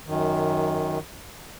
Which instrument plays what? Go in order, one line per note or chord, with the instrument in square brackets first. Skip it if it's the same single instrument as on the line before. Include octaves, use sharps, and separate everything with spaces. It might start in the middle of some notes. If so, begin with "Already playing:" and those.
[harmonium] F#2 D#3